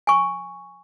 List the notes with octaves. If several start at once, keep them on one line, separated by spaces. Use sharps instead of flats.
G#5 C#6